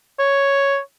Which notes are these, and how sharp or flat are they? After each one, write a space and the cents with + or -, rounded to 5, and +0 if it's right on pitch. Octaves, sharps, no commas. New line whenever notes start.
C#5 +0